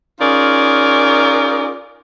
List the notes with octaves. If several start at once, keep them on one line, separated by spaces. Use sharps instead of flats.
C#4 D#4 F4 G#4 A#4 D5